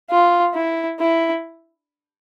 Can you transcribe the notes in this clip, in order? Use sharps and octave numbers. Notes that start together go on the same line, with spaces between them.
F4
E4
E4